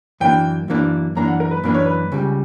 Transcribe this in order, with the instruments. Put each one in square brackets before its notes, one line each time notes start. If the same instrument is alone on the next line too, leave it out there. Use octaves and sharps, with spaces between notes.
[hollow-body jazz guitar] F#2 E3 A#3 D4 [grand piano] G5
[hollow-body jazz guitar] F#2 E3 A#3 D4
[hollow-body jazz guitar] F#2 E3 A#3 D4 [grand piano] A#5
[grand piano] F#5
A#4
B4
[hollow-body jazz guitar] F#2 E3 A#3 D4 [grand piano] B4
[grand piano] C#5
B4
[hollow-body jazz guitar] C#2 C#3 G3